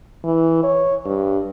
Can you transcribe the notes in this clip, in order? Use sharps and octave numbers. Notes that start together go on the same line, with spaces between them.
E3
C#5
G2